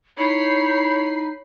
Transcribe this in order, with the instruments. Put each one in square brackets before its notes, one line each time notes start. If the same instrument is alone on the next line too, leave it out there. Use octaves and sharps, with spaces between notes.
[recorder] D#4 [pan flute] E4 [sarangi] C#5 [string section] B5 C7